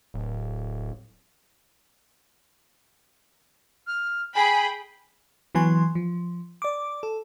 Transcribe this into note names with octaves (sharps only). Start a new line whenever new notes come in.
D1
F6
G#4 G5 G#5 B5
E3 F#3 B3 G#5 C6
F3
D5 D6
A4